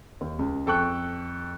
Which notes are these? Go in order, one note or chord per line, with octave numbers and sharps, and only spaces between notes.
D#2
C#2
F2 A4 G5 C#6 F#6